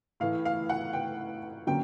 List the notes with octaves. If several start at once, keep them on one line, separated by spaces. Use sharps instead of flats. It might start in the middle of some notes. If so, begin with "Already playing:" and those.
A2 E3 A3 F5
F5
F#5
G5
D3 F#3 A#3 C#4 G5